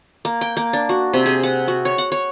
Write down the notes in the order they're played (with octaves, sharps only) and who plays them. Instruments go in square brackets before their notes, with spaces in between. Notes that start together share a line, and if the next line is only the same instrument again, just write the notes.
[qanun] A#3
G5
A#3
D4
F#4
C3
G#4
F#5
F#4
C#5
F#5
C#5